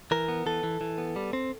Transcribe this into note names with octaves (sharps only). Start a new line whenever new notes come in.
E3 A#4
B3
E3 A4
E3
E3
B3
G3
C4